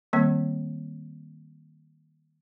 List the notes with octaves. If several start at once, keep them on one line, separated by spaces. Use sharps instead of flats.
D#3 G3 A#3 C4